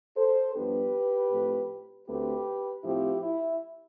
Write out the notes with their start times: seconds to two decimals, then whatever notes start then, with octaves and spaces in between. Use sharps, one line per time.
0.17 A4 C5
0.54 G2 F3 B3 D4 G4 B4
1.31 A2 F3 A3 C4
2.07 D2 D3 A3 C4 G4 B4
2.84 A2 F3 C4 E4 G4
3.23 E4